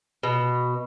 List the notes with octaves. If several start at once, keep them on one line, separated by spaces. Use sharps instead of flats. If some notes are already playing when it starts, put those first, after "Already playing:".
B2